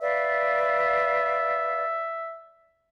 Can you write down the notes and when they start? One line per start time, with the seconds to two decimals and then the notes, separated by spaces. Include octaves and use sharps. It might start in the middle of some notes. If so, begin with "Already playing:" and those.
0.01 B4 D5 E5 F5